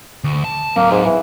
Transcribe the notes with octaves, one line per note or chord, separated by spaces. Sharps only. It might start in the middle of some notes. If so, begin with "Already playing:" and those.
D2
A5
F#3 A#3 C4
G#2
E3